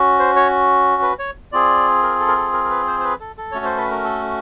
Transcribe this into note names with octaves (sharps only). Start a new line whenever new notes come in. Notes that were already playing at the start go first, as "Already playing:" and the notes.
Already playing: C#4 F#4
C5
C#5
B4
C#5
C4 F4 G#4 D5
A#4
A4
A#4
A4
A#4
A#4
B4
C5
C5
B4
A4
A4
A3 C#4 F#4 C#5
C5
B4
A#4
A4